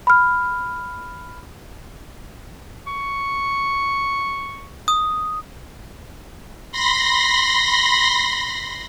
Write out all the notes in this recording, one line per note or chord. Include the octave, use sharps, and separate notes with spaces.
B5 F6
C#6
D#6
B5 C6 A#6